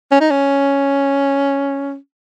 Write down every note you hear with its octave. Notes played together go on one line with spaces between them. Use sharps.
C#4
D#4
C#4